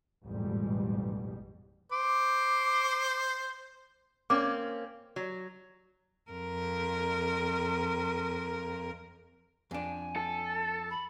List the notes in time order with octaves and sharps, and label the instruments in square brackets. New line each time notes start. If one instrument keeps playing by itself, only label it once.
[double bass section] A1 F2 G#2 B2 G3
[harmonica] C5 [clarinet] D6
[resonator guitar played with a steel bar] A#3 C4 C#4 [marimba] D6
[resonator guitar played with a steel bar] F#3
[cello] F2 A#4
[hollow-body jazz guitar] F2 D4 [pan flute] G#5
[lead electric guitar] A4
[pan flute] B5